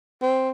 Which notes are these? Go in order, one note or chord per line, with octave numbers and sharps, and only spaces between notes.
C4